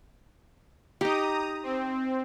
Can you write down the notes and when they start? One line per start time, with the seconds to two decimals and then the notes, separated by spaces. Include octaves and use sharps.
1.01 D#4 G4 A#5 D#6
1.63 C4